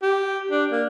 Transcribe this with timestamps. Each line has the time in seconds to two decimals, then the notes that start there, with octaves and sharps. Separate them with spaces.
0.02 G4
0.51 D4
0.71 A#3